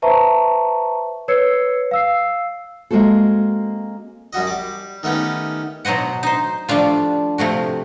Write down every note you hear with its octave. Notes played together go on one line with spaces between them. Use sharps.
B4 C5 E5 A5 A#5 C#6
B4 C#5 E6 G#6 C7 C#7
F5 E6 C7
G#3 A#3 C4 F#4 A4
F#2 G3 F#4 D#5
G3 D6
D#3 A3 B3 C#4 G4
B2 F#3 C5 D#5 F#5
D#4 C5
F3 G3 A3 D4 F4
C3 F3 A3 F#4